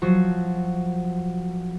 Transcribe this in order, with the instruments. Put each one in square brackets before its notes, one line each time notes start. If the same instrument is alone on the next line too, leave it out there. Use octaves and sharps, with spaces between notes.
[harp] F3 F#3 F#4